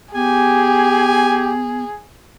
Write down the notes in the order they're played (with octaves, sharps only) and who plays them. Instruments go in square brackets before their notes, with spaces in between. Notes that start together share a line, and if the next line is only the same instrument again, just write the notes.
[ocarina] B3 [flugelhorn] G4 [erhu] G#4 [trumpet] G#5